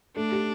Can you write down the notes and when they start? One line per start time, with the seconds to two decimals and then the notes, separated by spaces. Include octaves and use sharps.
0.16 A3 D4
0.32 G4